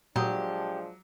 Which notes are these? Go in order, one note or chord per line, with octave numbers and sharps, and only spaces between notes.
A#2 F3 F#3 G#3 D4 G4 D#6